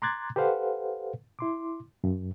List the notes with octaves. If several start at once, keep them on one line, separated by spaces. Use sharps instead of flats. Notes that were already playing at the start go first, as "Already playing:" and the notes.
A#5 C6 D6 F#6 G#6 A6
G4 A4 B4 C5 F5 F#5
E4 C6 D6
F#2